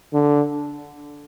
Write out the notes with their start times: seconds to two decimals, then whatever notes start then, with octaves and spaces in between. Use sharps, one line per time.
0.13 D3